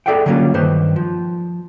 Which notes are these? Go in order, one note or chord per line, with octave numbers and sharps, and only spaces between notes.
G#4 A4 D5 E5 F#5 G5
D3 F#3 G3 A#3 C#4 F4
G2 D#3 B4 C5
F3